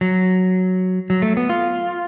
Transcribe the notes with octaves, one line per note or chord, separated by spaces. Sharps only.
F#3
F#3
A3
B3
F4